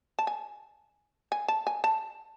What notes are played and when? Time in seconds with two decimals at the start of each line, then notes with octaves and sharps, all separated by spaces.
0.19 A5
0.27 G#5
1.32 G#5
1.48 A5
1.67 G#5
1.84 A5